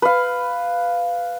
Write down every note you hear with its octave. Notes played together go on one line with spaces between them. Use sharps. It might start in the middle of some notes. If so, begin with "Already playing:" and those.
B4 F5